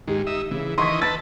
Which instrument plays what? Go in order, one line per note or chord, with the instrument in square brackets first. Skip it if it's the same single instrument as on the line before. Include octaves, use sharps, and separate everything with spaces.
[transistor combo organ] D#2 G#2 [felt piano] G4
[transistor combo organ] D#4 E5
[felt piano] C#3 [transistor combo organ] E3
[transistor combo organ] D#3 E3 D#5 [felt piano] C6 C#6 B6
[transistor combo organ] B4 A5 [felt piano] E6 A6